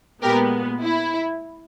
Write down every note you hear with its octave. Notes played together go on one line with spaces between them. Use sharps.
A#2 G#3 B3 G4 A#4
E4